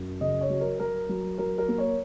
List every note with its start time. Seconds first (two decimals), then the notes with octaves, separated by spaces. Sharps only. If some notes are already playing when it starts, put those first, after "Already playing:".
Already playing: F#2
0.21 C#3 D#5
0.41 C#5
0.50 F#3
0.61 A#4
0.79 F#3 A#4
1.09 F#3
1.38 F#3 A#4
1.58 A#4
1.68 A#3
1.78 C#5